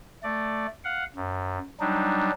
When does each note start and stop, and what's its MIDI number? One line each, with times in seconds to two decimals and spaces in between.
0.23 0.67 57
0.23 0.67 74
0.84 1.04 77
0.84 1.04 78
1.16 1.58 42
1.80 2.31 54
1.80 2.31 55
1.80 2.31 62
1.80 2.31 63